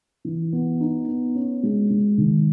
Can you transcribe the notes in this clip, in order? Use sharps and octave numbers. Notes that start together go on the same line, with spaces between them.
E3
B3
D#4
B3
C#4
G#3
G#3
D#3